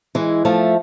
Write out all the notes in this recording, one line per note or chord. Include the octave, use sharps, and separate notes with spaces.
E3 G#3
F3 A3